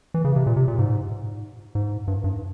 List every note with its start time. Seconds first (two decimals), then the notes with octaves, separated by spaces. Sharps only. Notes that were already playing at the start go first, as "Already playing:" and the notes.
0.14 E3
0.25 C#3
0.36 C3
0.46 A#2
0.56 C3
0.68 A#2
0.79 G#2
1.75 G#2
2.08 G2
2.24 G2